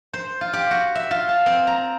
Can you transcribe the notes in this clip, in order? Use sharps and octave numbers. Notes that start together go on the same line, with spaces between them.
C5
F4
G4
F#4
E5
F4
A5
C4
A#5